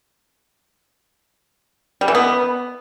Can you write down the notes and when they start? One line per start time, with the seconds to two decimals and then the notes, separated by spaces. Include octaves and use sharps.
2.01 G3
2.08 E3
2.15 B3